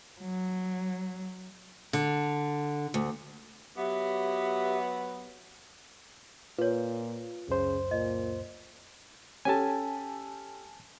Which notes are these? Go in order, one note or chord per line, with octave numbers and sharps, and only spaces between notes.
F#3
D3
D2
F#3 B3 G4 E5
A#2 F4 B4 C#5
C#2 F#2 C#3 C5
A#2 D#5
C#4 G4 A4 G#5 A5